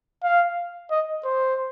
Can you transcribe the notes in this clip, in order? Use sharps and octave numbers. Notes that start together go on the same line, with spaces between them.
F5
D#5
C5